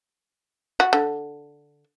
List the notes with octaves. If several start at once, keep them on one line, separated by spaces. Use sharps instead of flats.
F#4
D3